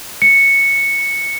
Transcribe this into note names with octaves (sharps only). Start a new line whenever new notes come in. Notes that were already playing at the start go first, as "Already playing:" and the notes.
C#7